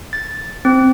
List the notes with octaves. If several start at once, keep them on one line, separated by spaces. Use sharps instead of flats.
A6
C4